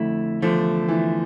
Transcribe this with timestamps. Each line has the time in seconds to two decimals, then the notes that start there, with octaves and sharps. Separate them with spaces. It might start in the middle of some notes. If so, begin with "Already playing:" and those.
Already playing: F2 D3 A3 E4
0.42 E2 D3 F3 A3
0.88 E3